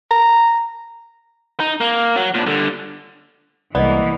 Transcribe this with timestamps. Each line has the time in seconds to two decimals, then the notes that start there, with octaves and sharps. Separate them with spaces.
0.11 A#5
1.60 D#4
1.80 A#3
2.16 F#3
2.34 A#2 D4
2.46 G2 D3
3.75 C2 E3 G#3 A#3 B3 D5 D#5